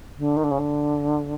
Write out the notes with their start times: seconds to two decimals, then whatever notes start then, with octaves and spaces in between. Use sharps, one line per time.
0.18 D3
0.37 D#3
0.44 D3
0.51 C#3
0.59 D3